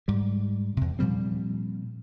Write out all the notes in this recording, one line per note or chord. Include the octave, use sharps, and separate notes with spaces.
G#2 G3
E2 C3
A#2 F3 G3 C4